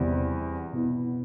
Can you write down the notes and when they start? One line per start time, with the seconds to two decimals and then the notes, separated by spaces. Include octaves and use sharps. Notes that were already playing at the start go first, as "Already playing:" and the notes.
Already playing: E2 C3 G3 C4
0.73 B2 B3 E4